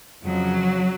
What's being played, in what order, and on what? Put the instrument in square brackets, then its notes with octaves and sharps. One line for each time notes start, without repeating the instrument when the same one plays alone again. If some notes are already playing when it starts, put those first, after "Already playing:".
[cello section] F2 C#3 F3 F#3